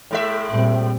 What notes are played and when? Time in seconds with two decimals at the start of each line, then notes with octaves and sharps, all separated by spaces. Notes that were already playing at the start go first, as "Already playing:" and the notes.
0.11 A2 G#3 E5
0.50 A#2 G3 C4